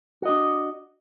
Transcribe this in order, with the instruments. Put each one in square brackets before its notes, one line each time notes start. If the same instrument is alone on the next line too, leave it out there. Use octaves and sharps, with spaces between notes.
[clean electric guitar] F#4
D#5
D4